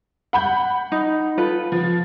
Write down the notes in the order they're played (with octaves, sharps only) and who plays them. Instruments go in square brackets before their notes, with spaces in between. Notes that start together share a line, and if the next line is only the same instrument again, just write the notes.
[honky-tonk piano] F#5 B5 G6
[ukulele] D#4
F4 A4 B4
[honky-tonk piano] F3